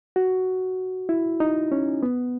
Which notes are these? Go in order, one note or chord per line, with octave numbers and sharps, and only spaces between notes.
F#4
E4
D#4
C#4
B3